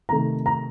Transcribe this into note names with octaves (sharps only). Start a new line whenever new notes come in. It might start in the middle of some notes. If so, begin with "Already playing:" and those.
C3 D#3 A3 A#5
A#5